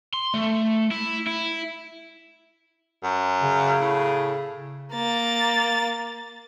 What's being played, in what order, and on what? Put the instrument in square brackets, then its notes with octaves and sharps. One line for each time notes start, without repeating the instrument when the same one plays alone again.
[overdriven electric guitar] C6
A3
E4
E4
[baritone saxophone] F#2
[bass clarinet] C#3
[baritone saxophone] A2
[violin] A#3 A6